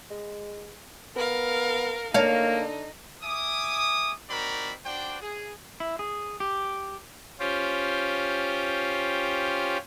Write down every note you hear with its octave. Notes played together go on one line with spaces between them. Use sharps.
G#3
B3 A#4 F5
D3 A#3 D#4 C#5 F5
E5 G#5 D6 D#6
C4 D#4 F#4 A#4 D5 B5
D4 F#4 C5 D5 G5
G#4
E4
G#4
G4
C#4 F4 G4 C5